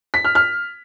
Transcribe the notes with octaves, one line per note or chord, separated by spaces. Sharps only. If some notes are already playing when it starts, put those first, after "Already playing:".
B6
F6
F6